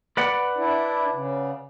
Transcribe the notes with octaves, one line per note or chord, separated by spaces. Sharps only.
B4 D5 F#5
D4 E4
C#3